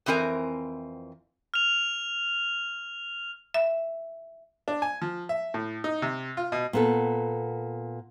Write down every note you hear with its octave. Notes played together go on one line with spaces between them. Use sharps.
F2 E3 C4 A#4 G#5
F6 F7
E5
D4
G#5
F3
E5
A2
D#4
C3
F4
B2
A#2 B3 A4